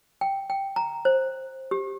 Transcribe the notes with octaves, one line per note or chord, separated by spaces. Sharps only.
G5
G5
A#5
C5
G4